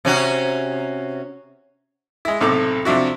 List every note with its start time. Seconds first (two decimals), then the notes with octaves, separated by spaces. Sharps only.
0.05 C3 C#4 F#4
2.25 G#3 E4
2.41 B1 A2 C3 A4 D6
2.85 C3 F3 D4 E4 F#4